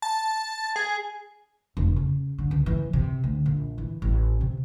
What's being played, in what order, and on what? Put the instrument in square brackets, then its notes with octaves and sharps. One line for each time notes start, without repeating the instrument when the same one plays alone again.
[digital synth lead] A5
G#4
[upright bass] F1
C#3
D3
C#2
E3
C3
D2
A#1
E3
A1
C3